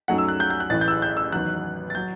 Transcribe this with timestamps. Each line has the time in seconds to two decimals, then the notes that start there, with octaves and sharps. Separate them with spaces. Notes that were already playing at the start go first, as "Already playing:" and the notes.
0.08 F#2 F#3 A3 D#4 F#5
0.18 E6
0.29 F#6
0.40 G6
0.50 G6
0.60 F#6
0.70 A1 A2 E3 A6
0.81 G6
0.88 E6
0.91 F#6
1.02 G6
1.17 E6
1.32 E2 D#3 F#3 F#6
1.90 A6
1.95 F#3 G6